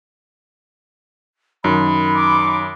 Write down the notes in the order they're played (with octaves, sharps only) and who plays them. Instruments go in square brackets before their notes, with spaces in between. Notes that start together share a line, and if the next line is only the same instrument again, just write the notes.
[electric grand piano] F#2 [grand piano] D#3 [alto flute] B5
[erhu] D6